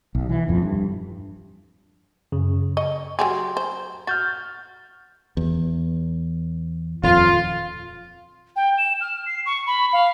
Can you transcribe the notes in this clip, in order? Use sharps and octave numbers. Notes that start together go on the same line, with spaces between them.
B1
E3
D#1 F2 F3
G2
F#2 C#3
D#5 C#6
F#3 G4 G#4 C6
C5
F#4 F6 G6 A6
E2
D#1 F2 F4
G5
E7
F6
C7
C#6
B5
F5